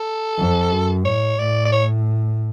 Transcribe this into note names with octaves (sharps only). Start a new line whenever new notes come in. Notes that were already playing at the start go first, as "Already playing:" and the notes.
Already playing: A4
F2
F#2
A2 C#5
A2 D5
D5
C#5